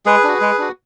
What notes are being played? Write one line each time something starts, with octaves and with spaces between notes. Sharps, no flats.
G#3 G#4 B4
D4 F#4
G#3
D4 F#4